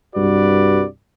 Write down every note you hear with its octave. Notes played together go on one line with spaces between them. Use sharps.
C2 G2 F#4 B4 D5